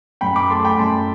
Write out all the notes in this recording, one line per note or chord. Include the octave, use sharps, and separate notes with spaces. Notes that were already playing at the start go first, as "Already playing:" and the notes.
F#2 G5 B5
B5 D6
A3 A5 C6
G5 B5
F#2 A5 C6